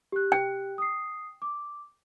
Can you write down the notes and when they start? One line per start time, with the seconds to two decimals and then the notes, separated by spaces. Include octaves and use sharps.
0.12 G4 F#6
0.32 G5
0.78 D#6 C7
1.42 D6